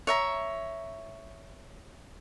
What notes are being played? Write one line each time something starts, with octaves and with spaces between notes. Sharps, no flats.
C#5 E5 A#5